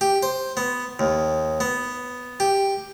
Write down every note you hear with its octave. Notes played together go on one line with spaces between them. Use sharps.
G4
C5
B3
D#2
B3
G4